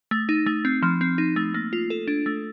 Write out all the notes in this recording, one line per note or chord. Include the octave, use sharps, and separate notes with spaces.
A3
D#4
A3
C4
F3
C4
D#4
A3
A#3
F4
A4
D4
A3